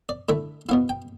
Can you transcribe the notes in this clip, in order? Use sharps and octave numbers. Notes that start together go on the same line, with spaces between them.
D5
D3 A3 E4 E5
B2 B3 E4 F5
G5